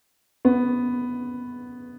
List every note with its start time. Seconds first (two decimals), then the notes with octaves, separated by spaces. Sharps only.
0.45 B3